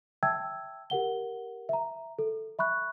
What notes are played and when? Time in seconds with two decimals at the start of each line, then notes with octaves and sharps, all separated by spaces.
0.23 E5 G5 A5 E6 G#6
0.90 G4 A#4 F#5 G7
1.69 E5 A#5
2.19 A4
2.59 E5 B5 C#6 F#6